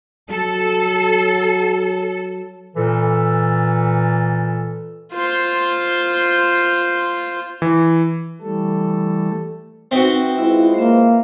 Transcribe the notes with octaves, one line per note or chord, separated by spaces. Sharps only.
F#3 A4
A#2 E3 A4
F4 C5
E3
E3 G3 A3 A4
C4 D#4 F#4 B4 E5
G#3 E4 F4 B4 E5
A#3 C5 E5